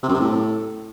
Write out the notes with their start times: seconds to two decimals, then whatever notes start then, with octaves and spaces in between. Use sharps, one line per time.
0.03 C3
0.09 F#2
0.14 C3
0.20 A2